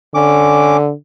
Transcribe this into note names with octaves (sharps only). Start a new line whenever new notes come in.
D3 C#4 D6